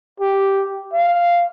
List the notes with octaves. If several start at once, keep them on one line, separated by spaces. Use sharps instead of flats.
G4
F5